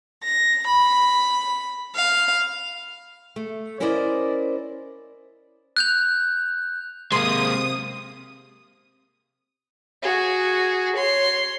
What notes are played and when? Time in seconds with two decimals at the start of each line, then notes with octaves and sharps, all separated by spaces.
0.22 A#6
0.67 B5
1.94 F5
3.36 A3
3.80 C#4 E4 A#4 C5 D5 D#5
5.77 F#6 G6 F7
7.12 C3 G#3 A#3 C6 D#6
10.02 F#4 G#4
10.95 C#5 C6